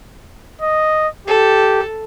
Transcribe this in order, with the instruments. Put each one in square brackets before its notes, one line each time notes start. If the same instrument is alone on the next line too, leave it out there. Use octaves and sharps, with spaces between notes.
[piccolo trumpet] D#5
[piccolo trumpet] G4 [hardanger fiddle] A4